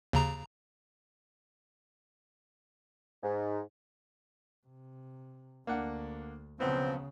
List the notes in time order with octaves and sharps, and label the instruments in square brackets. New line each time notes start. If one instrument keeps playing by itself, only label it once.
[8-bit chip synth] D#2 C#3 A#5
[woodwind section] G#2
[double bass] C3
[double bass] D2 [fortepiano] A#3 D4 F#5
[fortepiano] B1 B3 [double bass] C#3 [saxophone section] F3 C4